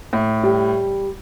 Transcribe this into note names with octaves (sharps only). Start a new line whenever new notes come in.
A2
G3